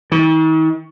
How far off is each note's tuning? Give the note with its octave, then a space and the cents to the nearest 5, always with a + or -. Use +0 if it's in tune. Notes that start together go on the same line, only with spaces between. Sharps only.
D#3 +45